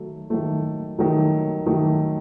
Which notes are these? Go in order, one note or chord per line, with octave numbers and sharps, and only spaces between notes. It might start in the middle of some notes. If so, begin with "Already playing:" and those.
Already playing: D#3 F#3 A3
D#3 F#3 A3
D#3 F#3 A3
D#3 F#3 A3